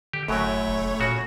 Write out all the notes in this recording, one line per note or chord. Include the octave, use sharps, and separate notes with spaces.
D3 G4
F#1 F#2 A2 F#3 A3 C#5
F1
A#2 C#3 F#4